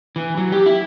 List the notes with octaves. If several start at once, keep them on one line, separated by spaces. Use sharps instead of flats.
E3
F#3
G4
E4